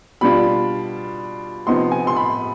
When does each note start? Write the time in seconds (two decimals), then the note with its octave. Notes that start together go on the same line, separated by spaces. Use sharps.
0.21 B2 G3 D4 F4 B5
1.67 C3 F3 B3 D#4 C6
1.92 G#5
2.07 C6
2.16 B5